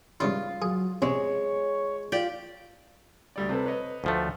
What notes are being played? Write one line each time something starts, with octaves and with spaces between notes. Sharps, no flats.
G2 C#3 E4 F4
F#3 G#4
C3 G#3 C#4 C#5
F4 G4 D5 G5
D2 G3 D5
C3 A4 B4
B4 C#5 D#5
D2 F3 A3